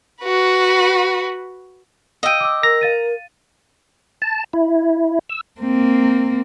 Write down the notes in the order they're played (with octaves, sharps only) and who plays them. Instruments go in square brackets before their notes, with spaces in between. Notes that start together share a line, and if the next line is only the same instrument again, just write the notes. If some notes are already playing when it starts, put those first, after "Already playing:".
[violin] F#4 B4
[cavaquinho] D#5 G5 [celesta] F5 E6 D#7
[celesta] D6 E6
[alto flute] A#4 [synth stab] A#5 [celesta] E6
[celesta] F5 A6 D#7
[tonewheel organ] A5
E4
E6
[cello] A#3 C4